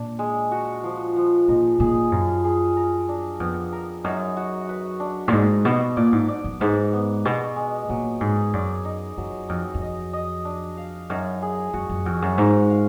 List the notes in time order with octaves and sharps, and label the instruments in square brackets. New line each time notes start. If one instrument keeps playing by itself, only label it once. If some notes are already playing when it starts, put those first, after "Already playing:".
Already playing: [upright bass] A#2 [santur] D4
[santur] G#3
F#4
F3
F3
[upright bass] A#2 [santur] D#4
[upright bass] A#2 [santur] G#4
[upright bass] F#2 [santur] F4
[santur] G#4
A#4
D4
[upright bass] F2 [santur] B3
[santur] A#4
[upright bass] F#2 [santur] D#4
[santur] F#4
B4
D4
[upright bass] A#2
[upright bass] G#2 [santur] D#5
[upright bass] B2 [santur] B3
[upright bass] A#2 [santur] D5
[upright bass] G#2
[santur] D5
[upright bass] F#2
[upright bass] G#2 [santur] B3
[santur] B3
[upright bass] B2 [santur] G#3
[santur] G#3
[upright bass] A#2 [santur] F#3
[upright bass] G#2 [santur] G#4
[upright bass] F#2 [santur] D5
[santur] D#4
[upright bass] F#2 [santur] F#3
[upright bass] F2 [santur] D#4
[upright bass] F2
[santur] D#5
D#5
D4
F5
[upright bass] F#2 [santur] D#4
[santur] G#4
[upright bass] F#2 [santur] F#4
[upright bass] F#2
[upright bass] F2 [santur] F#4
[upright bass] F#2
[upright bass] G#2 [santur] A#4
[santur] F5